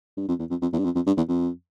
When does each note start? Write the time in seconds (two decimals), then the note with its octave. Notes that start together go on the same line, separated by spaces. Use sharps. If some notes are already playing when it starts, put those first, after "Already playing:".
0.17 G2
0.29 F2
0.39 E2
0.50 F2
0.62 F2
0.73 E2
0.79 G2
0.85 F2
0.95 F2
1.07 G2
1.17 E2
1.29 F2